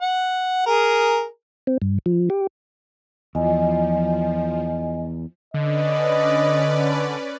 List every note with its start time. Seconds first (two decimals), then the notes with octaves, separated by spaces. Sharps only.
0.01 F#5
0.66 G#4 A#4
1.67 C4
1.82 G2
2.06 F3
2.30 G4
3.35 E2 F3 D#5 G#5
5.54 D3 C#4 B4 D5 D#5